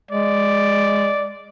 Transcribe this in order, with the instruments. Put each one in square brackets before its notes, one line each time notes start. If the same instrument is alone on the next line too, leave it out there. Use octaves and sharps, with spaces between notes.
[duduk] G#3 [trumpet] D5